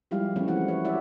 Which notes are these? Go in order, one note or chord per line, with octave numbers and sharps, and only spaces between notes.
F3 G3 G#3 E4 G4 F5
E3 A3 C4 C#4 C#5
A3 E4 F#4 F#5
F#4 B4 C#5
E4 F#4 G4 C#5 D5 E5